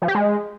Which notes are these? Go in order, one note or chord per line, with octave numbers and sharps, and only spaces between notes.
F3
G4
G#3